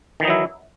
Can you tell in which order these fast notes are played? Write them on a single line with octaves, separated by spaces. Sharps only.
D#3 E3 D#4 F#3 E4